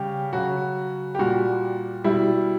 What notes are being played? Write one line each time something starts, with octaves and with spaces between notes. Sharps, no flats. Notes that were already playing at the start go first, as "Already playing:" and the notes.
Already playing: C#3 G3 G4
C#3 F#3 F#4
G4
A#2 G3 F#4
B2 G3 E4